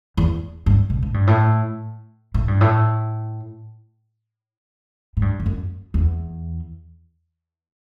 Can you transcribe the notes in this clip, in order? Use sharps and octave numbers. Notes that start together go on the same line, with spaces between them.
E2
G2
B2
A2
G2
A2
A2
G2
A2
A2
G2
E2
F#2
E2